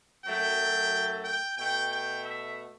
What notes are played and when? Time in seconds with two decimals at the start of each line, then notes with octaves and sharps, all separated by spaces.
0.24 F#2 F#3 A3 G5
1.25 G5
1.57 B2 A3 G5
1.91 G5
2.24 E5